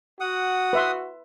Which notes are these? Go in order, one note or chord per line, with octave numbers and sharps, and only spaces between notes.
F#4 F#5 D#6
B4 E5 C6